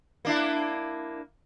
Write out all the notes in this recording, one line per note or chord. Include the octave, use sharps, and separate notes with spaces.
A#3 D4 E4